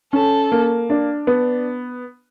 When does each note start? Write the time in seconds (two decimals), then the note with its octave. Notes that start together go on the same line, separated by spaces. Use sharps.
0.13 C#4 A4
0.52 A#3
0.90 D4
1.27 B3